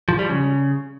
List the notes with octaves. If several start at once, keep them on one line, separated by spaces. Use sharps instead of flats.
F3
G3
C#3